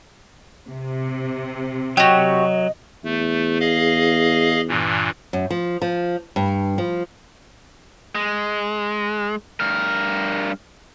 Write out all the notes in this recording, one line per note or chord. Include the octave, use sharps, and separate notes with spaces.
C3
F#3 F#4 G4 D#5
E2 A3
G#4 D#5 F5
G2 A#2 E3
F#2
F3
F3
G2
F3
G#3
G2 A#4